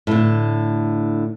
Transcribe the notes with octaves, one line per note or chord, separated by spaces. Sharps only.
A2 D3